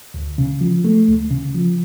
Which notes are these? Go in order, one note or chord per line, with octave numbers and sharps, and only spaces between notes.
D2
C#3
F3
A3
D2
C#3
F3